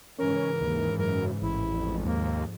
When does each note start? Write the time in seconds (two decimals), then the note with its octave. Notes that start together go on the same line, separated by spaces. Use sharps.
0.19 G#2 C#3 E3 C#4 A#4
0.61 D#2
0.98 F#2 A#4
1.42 A1 E4
1.72 F2 G#2
2.06 D#2 A#3